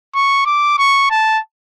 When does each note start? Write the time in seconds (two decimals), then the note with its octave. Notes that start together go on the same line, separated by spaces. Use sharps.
0.15 C#6
0.46 D6
0.78 C#6
1.10 A5